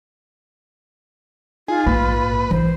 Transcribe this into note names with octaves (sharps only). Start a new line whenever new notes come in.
D#4 F4 G#4
A#1 G#2 A#3 B4
E3 C5